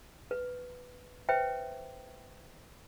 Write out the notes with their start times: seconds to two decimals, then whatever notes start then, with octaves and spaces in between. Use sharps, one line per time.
0.31 B4
1.29 B4 C5 E5 G5